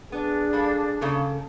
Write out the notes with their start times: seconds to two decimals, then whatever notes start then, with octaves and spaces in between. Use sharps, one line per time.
0.12 B3 D4 G#4
0.53 G3 A#3 A4
1.01 C#3 A#3 A4